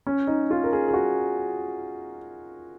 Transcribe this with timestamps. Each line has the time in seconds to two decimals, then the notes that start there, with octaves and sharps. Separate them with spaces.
0.07 C#4
0.27 D#4
0.51 F4
0.64 A#4
0.73 G#4
0.88 G#4
0.93 F#4